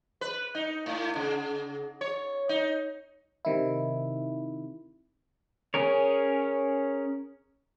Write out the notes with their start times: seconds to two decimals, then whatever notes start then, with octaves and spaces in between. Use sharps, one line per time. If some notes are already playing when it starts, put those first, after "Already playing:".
0.21 B4
0.55 D#4
0.86 A2
1.16 C#3
2.01 C#5
2.49 D#4
3.45 C3 D#3 E4
5.74 C#4 G#4 A#4 C#5